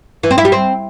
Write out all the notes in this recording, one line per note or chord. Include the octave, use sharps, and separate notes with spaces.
E3
C4
E4
G3
C4